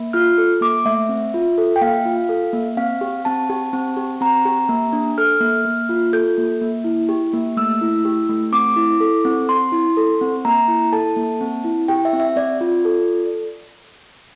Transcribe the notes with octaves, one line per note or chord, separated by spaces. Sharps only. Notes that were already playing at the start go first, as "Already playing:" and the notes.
Already playing: A#3
F4 F6
A4
A#3 D6
A3 E5
C4
F4
A4
G5
A#3 F5
F4
A4
A#3
C4 F5
G4
C4 A5
G4
C4
G4
C4 A#5
G4
A#3
D4
A4 F6
A#3
A#3
F4
A4 G6
A#3
A#3
E4
G4
A#3
A3 E6
E4
G4
A3
C4 D6
E4
A4
C4
C4 C6
E4
A4
C4
A#3 A#5
E4
A4 A5
A#3
C4
E4
G4 G5
E5
C4
E5
C4 D5
F4
A4